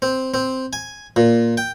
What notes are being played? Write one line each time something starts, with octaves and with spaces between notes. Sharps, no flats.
C4
C4
G#5
A#2
G5